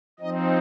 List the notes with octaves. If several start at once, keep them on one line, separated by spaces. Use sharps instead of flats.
F3 C4 D#4 D#5